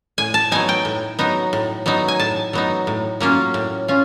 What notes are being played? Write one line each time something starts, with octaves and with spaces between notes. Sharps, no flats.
A2 G#5
A5
F#3 B3 D#4 G#5
G5
A2
F#3 B3 D#4
A2
F#3 B3 D#4
G#5
A2 A5
F#3 B3 D#4
A2
F#3 A#3 C#4 F4
A2
C#4 F4